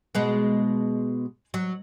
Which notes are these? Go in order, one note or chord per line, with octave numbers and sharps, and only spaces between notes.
B2 G#3 B3
F#3